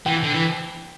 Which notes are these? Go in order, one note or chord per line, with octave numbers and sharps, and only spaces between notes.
E3 G5
D3
E3